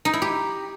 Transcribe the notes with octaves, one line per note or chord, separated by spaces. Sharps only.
D#4
E4
G4